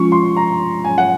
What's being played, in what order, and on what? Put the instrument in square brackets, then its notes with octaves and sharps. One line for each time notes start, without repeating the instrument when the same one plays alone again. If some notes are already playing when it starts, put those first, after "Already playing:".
Already playing: [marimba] F3 G#3 C#4 F4 [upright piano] C#6
[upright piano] C6
A#5
[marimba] G#2 F#3 C#4 G#4 C#5 [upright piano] G#5
[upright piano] F#5